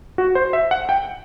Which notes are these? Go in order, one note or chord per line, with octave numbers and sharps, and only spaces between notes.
F#4
C5
E5
F#5
G5